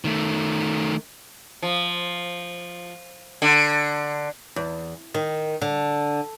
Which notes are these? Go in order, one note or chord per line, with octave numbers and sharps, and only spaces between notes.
D#3 A3
F3
D3
E2
D#3
D3